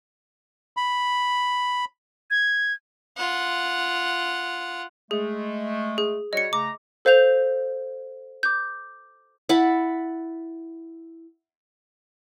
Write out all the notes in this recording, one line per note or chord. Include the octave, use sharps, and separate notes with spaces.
B5
G#6
F4 F#5
G#3 A3 G#4
G#4
G3 F#4 C#5 D#5 C#7
C#3 A3 A#5 D6
A4 C5 F5 G6 F7
D6 G6
E4 F#5 A5 B5